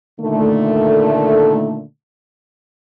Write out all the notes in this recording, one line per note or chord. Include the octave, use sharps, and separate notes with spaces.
A#2 D3 D#3 A3